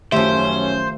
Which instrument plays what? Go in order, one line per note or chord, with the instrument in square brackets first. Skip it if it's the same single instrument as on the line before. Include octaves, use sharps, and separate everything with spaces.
[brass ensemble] F#2 C#4 [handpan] D#3 A3 E5 [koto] F3 G4 [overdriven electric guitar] C5